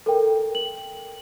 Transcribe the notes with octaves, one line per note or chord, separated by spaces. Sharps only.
A4 A#4 G5
F#7